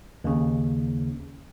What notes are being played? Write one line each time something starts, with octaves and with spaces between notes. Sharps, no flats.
D#2 C#3